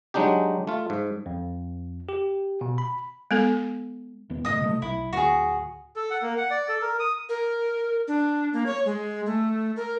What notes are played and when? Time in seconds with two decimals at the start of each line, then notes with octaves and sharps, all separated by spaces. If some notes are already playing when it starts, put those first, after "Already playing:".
0.14 F#3 G#3 D4 D#4 G4
0.67 A3 F4
0.90 G#2
1.26 F2
2.09 G4
2.61 B2
2.78 B5
3.31 G#3 B3 A4
4.30 D#1 B3
4.45 F#1 A2 D#5 D#6
4.61 C3 F#3 A3
4.82 B1 E4
5.13 D1 F#4 G#4
5.96 A4
6.10 F#5
6.22 A#3
6.38 F#5
6.50 D5
6.69 A4
6.82 A#4
7.00 D#6
7.29 A#4
8.08 D4
8.53 A#3
8.66 C#5
8.85 G#3
9.26 A3
9.76 A#4